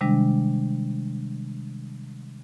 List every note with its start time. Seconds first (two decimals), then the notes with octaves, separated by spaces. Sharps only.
0.01 C3 D#3 G3 G#3 D4